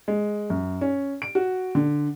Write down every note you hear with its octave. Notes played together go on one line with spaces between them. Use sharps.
G#3
F#2
C#4
D7
F#4
D3